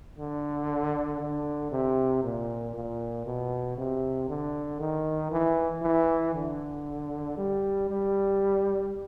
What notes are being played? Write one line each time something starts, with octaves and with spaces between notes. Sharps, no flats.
D3
D3
C3
A#2
A#2
B2
C3
D3
D#3
E3
E3
D3
G3
G3